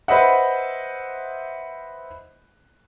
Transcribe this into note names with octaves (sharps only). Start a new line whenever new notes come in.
B4 C5 D#5 E5 F#5